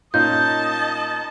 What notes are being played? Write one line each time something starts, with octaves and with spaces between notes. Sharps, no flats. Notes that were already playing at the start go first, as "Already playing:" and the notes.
A#2 A#3 C#4 D#4 F4 D#5 A5 G6